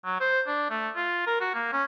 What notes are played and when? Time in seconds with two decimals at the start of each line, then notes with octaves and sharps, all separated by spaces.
0.05 F#3
0.20 C5
0.47 D4
0.70 A3
0.96 F4
1.27 A#4
1.40 F#4
1.54 A#3
1.72 C#4